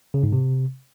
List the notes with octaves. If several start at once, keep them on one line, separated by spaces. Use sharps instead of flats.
C#3
G#2
C3